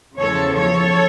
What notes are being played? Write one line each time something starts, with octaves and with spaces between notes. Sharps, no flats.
E2 C#3 F3 A4 C#5
A4 C#5